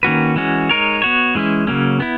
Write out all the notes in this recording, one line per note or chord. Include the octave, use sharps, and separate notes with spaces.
D#3 A#3 C#4 F#4 B4
E3 G#3 C#4 F#4
G#3 D#4 A#4 C#5
B3 F#4 C#5
E3 G#3 C#4 E4
C#3 F#3 A#3 C#4
B3 E4